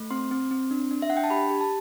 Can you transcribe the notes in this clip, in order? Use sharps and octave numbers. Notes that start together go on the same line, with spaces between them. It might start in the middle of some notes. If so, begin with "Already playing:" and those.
Already playing: A3
C4 C6
C4
C4
D4
D4
E5
D4 F#5
G5
A5
G4 B5
G4
A5